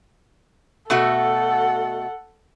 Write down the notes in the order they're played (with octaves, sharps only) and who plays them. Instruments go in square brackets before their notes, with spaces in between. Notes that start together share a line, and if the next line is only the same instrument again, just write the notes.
[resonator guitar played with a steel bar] B2 A3 F#4 [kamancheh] A4 F#5